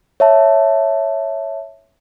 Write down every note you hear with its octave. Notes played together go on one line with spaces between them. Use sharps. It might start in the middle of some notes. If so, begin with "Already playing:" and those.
C#5 E5 A5